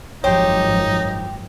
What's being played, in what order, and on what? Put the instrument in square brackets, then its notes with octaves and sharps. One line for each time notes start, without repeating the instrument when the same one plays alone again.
[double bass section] G#1 F#2 F3 [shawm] D#4 [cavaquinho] G4 C5 [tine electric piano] C#5